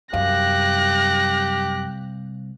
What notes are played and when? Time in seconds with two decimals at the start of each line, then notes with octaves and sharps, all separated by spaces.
0.13 C2 F#2 G4 F5 F#6 A#6